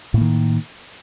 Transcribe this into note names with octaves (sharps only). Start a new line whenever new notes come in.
A2 D#3 A#3